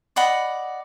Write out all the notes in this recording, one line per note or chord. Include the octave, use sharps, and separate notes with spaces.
D5 D#5 F#5 B5